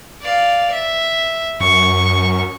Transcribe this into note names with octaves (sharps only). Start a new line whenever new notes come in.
D5 F5
E5
F#2 C#6